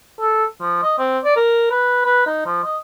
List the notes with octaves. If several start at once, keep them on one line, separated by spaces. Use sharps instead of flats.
A4
F3
D#5
C4
D5
A#4
B4
B4
D#4
F3
D#5